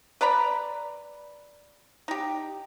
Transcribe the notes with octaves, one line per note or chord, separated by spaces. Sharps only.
B4 D5 A#5 B5
D#4 G4